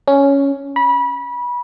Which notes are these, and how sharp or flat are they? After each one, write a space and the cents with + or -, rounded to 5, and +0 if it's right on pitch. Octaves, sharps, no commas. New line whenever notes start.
C#4 +5
B5 -25